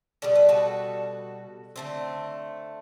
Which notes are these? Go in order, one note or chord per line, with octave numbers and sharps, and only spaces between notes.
B2 G3 D4 A4
B4
F#4 A4
D3 A3 C4